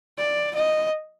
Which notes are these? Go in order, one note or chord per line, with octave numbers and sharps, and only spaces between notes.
D5
D#5